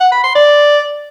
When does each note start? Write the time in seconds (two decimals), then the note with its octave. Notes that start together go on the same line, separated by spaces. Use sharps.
0.01 F#5
0.12 B5
0.24 C6
0.35 D5